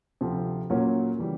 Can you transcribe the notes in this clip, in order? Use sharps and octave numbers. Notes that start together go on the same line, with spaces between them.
D2 C3 F3
A#2 F#3 A#3 C#4 F#4
C#3 E3 G3